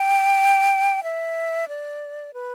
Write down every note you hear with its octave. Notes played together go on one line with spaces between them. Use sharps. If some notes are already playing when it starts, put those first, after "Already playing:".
Already playing: G5
E5
D5
B4